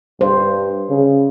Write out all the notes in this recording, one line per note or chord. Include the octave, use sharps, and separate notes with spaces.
G2 C5
C#3